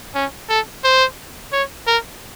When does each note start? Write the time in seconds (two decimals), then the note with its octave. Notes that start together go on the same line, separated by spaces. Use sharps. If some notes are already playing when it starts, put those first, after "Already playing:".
0.15 C#4
0.49 A4
0.84 C5
1.52 C#5
1.87 A#4